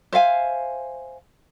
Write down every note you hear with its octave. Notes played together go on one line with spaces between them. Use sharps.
C5 E5 F5 G#5